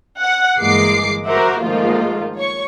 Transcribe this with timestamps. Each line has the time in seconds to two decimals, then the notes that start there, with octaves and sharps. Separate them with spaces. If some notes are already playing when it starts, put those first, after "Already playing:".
0.20 F#5
0.59 G1 E3 G#3 A#3 D6 C7
1.27 F#4 A#4 C5 E5 F#5 D6
1.60 G#2 D#3 F3 A3 A#3 F4
2.36 C#5 C#6